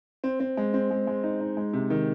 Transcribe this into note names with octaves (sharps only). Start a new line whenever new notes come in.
C4
C4
G#3
C4
G#3
G#3
D#4
D#4
G#3
C3
D#3